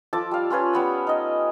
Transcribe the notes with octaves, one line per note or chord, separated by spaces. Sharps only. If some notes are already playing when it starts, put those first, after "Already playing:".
F3 A4 A5 D6
G3 F5
C#4 F4 B4 C#5
G3 B3 B5
D#4 D#5